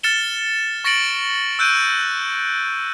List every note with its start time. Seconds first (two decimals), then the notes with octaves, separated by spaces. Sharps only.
0.03 F6 A6 C#7 E7 G7
0.84 C#6 A6 A#6 C#7 D7 F#7
1.59 E6 F#6 G6 D7 D#7